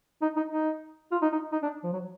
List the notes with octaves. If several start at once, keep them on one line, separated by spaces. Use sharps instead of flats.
D#4
D#4
D#4
F4
D#4
D#4
D#4
D4
F3
F#3